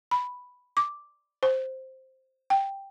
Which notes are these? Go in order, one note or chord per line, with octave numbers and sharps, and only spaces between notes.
B5
D6
C5
G5